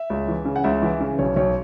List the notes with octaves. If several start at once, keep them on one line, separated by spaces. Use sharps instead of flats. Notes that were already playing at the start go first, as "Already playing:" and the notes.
Already playing: E5
C#2
E3
C#3
F#5
C#2 E5
E3
C#3
B1 C#5
B1 C#5